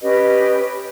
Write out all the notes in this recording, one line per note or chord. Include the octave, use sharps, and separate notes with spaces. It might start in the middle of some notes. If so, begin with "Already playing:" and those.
C#4 G4 B4 D#5